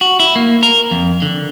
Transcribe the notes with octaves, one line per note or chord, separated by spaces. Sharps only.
F#4
E4
A#3
A#4
F2
D3